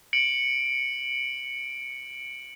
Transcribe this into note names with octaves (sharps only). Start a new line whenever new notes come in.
C#7 D7 F#7